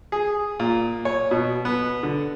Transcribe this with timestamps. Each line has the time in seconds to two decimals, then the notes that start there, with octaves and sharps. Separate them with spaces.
0.12 G#4
0.60 A#2
1.05 C#5
1.31 B2
1.65 B3
2.03 D3